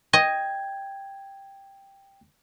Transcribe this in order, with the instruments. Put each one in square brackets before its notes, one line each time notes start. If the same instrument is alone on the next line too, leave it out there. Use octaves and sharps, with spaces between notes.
[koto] D#5 [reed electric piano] G5 G#6